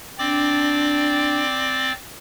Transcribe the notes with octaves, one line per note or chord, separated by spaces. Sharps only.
C4 D4 D5 D6